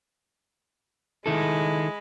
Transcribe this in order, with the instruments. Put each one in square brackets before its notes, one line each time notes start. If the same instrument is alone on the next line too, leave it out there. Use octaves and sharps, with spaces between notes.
[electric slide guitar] D#3 E4 A4 [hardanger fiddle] G#3 B5